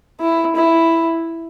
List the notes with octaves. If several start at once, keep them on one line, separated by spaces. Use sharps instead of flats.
E4
E4